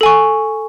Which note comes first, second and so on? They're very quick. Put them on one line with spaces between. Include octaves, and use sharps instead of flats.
A4 G#5 C#6